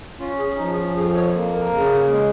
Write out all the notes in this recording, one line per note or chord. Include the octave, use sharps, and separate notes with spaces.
C#4 F4
G#4
F3 D#4
G#4
F4
F2 G#4
C#5
A#3
A#4
C#3
G#3